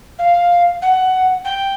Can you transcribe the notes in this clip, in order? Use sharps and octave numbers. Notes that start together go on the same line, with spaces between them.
F5
F#5
G5